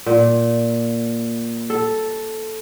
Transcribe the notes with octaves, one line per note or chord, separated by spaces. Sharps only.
A#2
A4